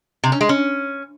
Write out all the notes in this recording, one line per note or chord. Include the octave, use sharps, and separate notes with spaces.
C3
C#4
G#3
C#4